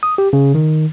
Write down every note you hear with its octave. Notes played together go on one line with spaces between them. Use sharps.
D#6
G4
C#3
D#3